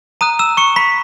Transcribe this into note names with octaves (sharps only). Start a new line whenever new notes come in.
A#5 D#6 F#6 D#7
E6 E7
C#6 C#7
B5 B6